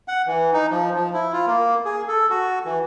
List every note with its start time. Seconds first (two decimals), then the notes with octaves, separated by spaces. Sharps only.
0.08 F#5
0.27 E3
0.54 D#4
0.71 F3
0.95 F3
1.14 E4
1.33 F4
1.47 A#3
1.85 G#4
2.08 A4
2.30 F#4
2.65 E3